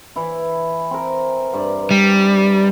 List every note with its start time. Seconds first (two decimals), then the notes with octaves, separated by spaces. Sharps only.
0.16 E3 E4
0.91 C4 A#4
1.53 G2 D5
1.91 G3